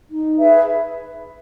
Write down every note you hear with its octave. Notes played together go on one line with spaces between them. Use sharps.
D#4
G#4 B4 E5